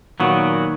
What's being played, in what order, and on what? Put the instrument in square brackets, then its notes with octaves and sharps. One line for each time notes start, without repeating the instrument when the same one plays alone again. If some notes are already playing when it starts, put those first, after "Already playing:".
[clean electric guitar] A#2 F#3 B3 F#4 [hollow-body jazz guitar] D#3